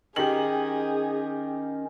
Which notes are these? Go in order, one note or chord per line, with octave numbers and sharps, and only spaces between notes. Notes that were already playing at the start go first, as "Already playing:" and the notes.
D#3 C#4 G4 G#4 F#7